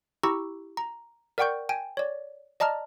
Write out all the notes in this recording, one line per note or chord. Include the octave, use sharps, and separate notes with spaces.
E4 G4 A#5 C#6 E6
A#5
A#4 D5 F#5 G5 C#6 G6
G5 G#5
C#5 D5
D5 D#5 A5 A#5 F6